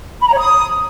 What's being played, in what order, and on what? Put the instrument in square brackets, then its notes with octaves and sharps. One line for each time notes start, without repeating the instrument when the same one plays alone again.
[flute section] B5
A#5
C#5
D#6